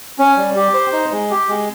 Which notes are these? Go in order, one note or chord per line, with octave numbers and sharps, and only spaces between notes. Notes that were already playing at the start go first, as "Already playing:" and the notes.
C#4
G3
G4
C5
D#4
G#3
G4
G#3